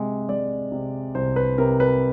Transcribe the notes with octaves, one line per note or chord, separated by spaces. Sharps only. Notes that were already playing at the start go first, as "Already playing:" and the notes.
Already playing: C3 G#3
G#3 D5
C3
C2 C5
B4
C3 A#4
B4